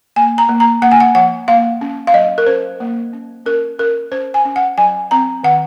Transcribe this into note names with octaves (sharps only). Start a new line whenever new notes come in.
A#3 G#5
A#5
A#3
A#5
A#3 F#5
G#5
F#5
F3 F#5
A#3 F5
C#4
F5
F#3 D#5
A#4
C#4 C5
A#3
C#4
C#4 A#4
C#4 A#4
C#4 C5
G#5
C#4
F#5
F#3 G#5
C4 A#5
D#3 F#5